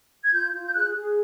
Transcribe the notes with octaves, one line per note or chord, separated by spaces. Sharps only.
G#6
F4 G6
F4
G6
G#4 F#6
G#4